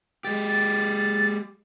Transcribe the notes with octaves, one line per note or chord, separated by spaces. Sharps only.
G#3 G4 A6